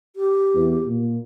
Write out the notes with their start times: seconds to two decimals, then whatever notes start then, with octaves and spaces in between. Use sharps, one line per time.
0.16 G4
0.55 E2
0.86 A#2